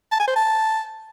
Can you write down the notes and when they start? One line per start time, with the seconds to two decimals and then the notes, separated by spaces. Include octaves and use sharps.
0.12 A5
0.20 G#5
0.27 C5
0.35 A5